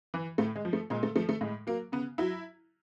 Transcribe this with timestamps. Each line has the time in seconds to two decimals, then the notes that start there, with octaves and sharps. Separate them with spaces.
0.14 E3
0.38 A2 A3
0.56 G#3
0.65 F3
0.73 A3
0.90 A#2 G#3
1.03 A3
1.16 F3 A3
1.29 A3
1.41 A2 G#3
1.67 F#3 A#3
1.92 C#3 B3
2.18 F#3 E4